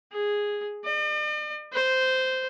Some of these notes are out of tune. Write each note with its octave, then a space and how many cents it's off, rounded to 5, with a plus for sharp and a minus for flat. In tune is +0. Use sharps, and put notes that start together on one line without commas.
G#4 -5
D5 +45
C5 -10